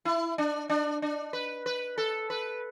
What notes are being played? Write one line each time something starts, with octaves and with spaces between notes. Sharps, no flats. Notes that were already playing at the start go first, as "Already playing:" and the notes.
E4
D4
D4
D4
B4
B4
A4
B4